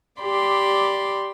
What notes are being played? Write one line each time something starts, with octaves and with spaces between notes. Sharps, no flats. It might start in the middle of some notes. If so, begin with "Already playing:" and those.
G4 D5 B5 C6